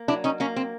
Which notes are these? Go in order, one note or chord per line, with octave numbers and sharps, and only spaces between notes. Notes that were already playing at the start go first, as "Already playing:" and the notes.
Already playing: A#3
F#3 D4 E4
C#4 D#4
A#3 C#4
C4